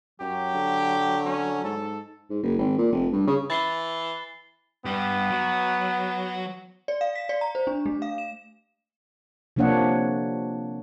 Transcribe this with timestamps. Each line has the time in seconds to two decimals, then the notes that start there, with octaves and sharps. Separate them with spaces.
0.20 F#2 F#3 G4
0.54 D3
1.26 C#4
1.64 G#2 A4
2.30 G#2
2.43 F#1
2.59 G#1
2.78 A#2
2.92 F1
3.12 G2
3.27 C#3
3.50 E3 B5 A6 C7 G7
4.85 G2 B3 G4
5.30 F#3
6.88 D5
7.01 F5
7.15 B6
7.29 D5
7.41 A#5
7.55 C5
7.67 D4
7.86 A3
8.02 F5
8.18 E7
9.56 C3 F3 A#3 D4 C#5 F#5